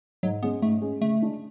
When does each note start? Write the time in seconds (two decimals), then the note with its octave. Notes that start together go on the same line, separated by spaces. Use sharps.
0.23 G#2 F#3
0.43 G#3 B3 C#4 G#4
0.62 G#2 A3
0.82 G#3 C#4 G#4
1.01 C#3 A3
1.22 G#3 D4